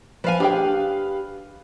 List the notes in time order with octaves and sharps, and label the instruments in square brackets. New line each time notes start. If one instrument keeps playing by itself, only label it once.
[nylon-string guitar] F3 G#5 [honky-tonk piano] B4 F5
[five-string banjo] D4 G#4 G5 [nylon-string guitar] G4